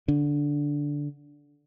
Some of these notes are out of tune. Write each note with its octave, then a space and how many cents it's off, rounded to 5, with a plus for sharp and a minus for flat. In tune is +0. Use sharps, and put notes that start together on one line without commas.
D3 -10 D4 -10